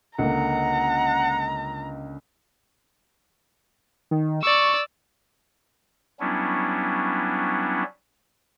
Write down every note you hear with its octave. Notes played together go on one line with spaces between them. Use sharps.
C#2 D3 A#3 F#5 A#5
D#3
D5 C#6 E6
F#3 G3 B3 C#4 D4 E4